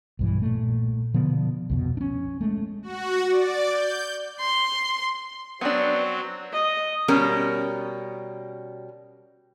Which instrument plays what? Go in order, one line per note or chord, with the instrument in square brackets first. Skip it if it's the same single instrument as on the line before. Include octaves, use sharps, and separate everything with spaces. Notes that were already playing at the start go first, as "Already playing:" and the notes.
[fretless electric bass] B1 G2 E3
A#2 A3
B2 D3 F3 B3
C2 F2 B2
C#4 D4
G#3 A3
[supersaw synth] F#4
D5
G6
[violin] C6
[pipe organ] F#3 C4 [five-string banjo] B3 D4
[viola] D#5
[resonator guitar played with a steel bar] B2 G3 C#4 A#4